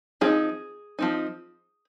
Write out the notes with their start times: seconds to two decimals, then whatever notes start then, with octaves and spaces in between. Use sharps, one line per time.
0.21 F3 C4 D#4 F4 G#4
0.99 F3 C4 D#4